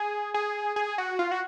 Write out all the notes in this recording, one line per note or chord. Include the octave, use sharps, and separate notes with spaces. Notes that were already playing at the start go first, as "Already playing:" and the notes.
Already playing: G#4
G#4
G#4
F#4
F4
F#4